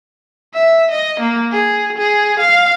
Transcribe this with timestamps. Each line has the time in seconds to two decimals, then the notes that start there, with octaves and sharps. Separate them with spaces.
0.55 E5
0.91 D#5
1.20 A#3
1.52 G#4
1.98 G#4
2.40 F5